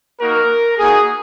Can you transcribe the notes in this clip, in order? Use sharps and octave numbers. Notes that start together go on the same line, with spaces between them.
A#3 D#4 F#4 A#4
A#3 D#4 F#4 G#4